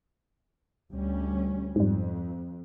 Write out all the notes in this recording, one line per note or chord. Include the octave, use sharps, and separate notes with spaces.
D2 G3 C#4
F2 G#2 G3